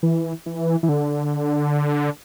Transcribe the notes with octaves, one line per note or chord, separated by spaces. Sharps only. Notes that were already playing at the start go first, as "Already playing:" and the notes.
E3
E3
E3
D3